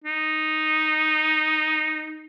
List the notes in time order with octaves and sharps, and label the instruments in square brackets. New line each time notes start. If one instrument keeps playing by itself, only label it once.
[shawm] D#4